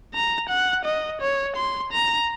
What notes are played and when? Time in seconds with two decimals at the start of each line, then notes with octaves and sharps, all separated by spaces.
0.14 A#5
0.49 F#5
0.85 D#5
1.21 C#5
1.56 C6
1.92 A#5